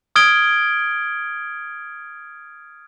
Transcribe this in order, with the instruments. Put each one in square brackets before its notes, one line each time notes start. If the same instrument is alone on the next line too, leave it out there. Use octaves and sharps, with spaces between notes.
[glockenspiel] D#6 F6 G#6 D7 G7